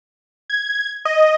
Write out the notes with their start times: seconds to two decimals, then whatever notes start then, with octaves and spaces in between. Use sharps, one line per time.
0.50 G#6
1.05 D#5